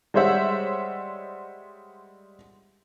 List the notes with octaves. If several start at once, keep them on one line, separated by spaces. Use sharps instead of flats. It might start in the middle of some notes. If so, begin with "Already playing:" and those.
G3 G#3 C5 C#5 E5 F#5